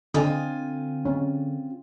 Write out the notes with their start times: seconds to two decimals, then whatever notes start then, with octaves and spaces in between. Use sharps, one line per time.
0.14 D3 C4 F4 D#5 G#5 D#6
1.05 C#4